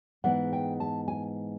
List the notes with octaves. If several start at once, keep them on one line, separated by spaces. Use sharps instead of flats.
G#2 E3 G#3 B3 F#5
G5
A5
G#5